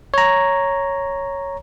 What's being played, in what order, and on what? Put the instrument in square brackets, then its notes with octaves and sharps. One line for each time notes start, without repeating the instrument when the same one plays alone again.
[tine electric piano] C#5 A#5